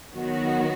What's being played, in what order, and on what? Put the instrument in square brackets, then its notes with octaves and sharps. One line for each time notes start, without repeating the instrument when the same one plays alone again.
[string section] D#3 F#3 B3 F#4